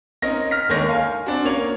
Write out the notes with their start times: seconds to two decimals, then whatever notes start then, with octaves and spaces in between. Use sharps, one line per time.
0.22 C4 C#4 D#4 A#4 A#6
0.51 F6 A#6 B6
0.69 D#2 D3 D#3 G#3 C#5 A#6
0.89 F5 G#5
1.26 C4 D4 F#4
1.45 A#3 C#4 C#5 F7